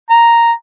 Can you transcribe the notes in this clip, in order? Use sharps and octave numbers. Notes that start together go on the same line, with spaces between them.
A#5